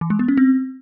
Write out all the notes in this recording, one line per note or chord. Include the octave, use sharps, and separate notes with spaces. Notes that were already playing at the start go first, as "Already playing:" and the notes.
E3
G#3
B3
C#4
C4